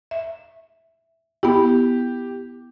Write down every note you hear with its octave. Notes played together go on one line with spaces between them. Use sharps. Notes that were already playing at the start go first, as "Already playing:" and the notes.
E5
B3 E4 G4